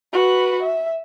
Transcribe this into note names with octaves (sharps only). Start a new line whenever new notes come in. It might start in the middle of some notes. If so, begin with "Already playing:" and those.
F#4 B4
E5